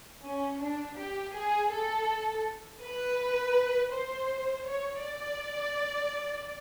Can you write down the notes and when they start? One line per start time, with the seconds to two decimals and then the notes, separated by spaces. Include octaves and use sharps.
0.24 C#4
0.61 D4
0.98 G4
1.35 G#4
1.71 A4
2.81 B4
3.92 C5
4.66 C#5
5.03 D5